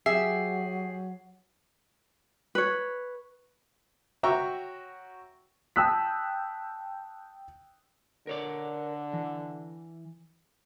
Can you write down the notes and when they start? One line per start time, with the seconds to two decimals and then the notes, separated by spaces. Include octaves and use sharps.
0.06 F#3 G4 G#4 E5 C7
2.55 B4 C#5
4.23 F#4 C#5 E5 G5 A#5 C#6
5.76 G5 A5 D#6 E6 F#6 B6
8.27 D3 A#4 C#5 D5
9.13 E3